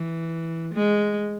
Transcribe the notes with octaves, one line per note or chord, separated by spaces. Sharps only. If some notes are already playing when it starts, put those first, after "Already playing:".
Already playing: E3
G#3